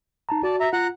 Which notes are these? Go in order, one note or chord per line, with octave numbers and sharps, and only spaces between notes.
D#4 A5 A#5
F#4 D5 A5
E5 A#5
F4 F#5 A#5 F#6